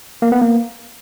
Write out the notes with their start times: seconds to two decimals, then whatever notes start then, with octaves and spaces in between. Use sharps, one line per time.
0.22 A#3
0.32 B3
0.42 A#3